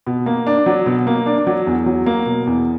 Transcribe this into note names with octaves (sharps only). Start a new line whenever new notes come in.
B2
A#3
D4
F#3
B2
A#3
D4
F#3
E2
F#3
A#3
B2
E2